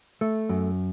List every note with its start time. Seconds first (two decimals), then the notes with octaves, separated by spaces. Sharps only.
0.21 A3
0.49 F#2